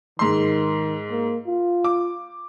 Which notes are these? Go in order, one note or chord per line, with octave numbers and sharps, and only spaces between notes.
G#2 D#3 C6
A#3
F4
D6